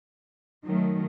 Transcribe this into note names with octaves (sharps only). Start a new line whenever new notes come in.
D#3 F#3 A3